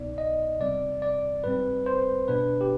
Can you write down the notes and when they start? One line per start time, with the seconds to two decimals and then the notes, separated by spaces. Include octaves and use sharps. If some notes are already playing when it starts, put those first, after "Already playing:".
Already playing: C2 B2 B3 D#4 D5
0.18 D#5
0.60 C3 G3 C4 D5
1.02 D5
1.44 G#2 G3 C4 B4
1.86 C5
2.28 B2 B3 D4 B4
2.61 G4